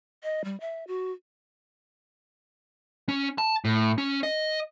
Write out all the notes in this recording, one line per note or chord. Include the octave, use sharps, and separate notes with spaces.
D#5
G3
E5
F#4
C#4
A5
A2
C#4
D#5